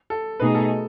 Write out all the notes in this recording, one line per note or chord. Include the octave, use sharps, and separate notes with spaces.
A4
B2 A3 D#4 G#4 B4
A4